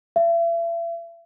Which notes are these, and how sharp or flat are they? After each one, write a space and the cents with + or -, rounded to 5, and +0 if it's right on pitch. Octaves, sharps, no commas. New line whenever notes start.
E5 +40